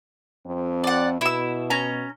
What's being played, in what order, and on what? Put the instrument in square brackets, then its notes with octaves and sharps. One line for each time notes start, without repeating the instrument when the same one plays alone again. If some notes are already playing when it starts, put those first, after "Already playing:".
[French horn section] F2 C4
[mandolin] D5 F#5
[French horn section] B2 [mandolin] E4 E6
[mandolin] C#4 A#5